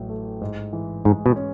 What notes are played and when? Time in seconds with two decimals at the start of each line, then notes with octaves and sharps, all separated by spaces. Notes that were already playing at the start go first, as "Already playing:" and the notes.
Already playing: A1 A2 F#3
0.09 A3
0.41 G#2
0.73 E3
1.05 G#2 G#3
1.26 B2
1.36 C#4